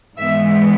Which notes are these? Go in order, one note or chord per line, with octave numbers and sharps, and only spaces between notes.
G#2 E3 G#3 B3 E5